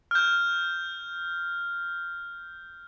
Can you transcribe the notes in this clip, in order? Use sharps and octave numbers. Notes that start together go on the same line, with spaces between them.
F6 G6